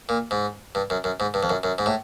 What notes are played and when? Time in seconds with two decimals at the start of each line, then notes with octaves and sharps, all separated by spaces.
0.09 A#2
0.31 G#2
0.75 G2
0.90 F#2
1.04 F#2
1.20 G#2
1.34 G2
1.43 F2
1.50 F#2
1.63 F#2
1.78 G#2
1.86 A2